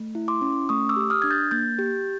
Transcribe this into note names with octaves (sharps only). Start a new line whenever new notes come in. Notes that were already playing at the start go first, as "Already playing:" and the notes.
Already playing: A3
E4
C6 D6
C#4
A3 C#6 D#6
D6 E6
G4
D#6 F6
D4 G#6
G6 A6
A#3 G6 A6
G4